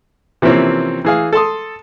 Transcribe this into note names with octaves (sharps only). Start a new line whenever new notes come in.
C3 E3 F3 A#3 C4 C#4
E3 G#4 F5
A4 A5 C6 D#6